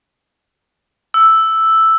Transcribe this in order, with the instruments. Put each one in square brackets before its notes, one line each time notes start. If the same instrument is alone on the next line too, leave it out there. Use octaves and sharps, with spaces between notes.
[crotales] E6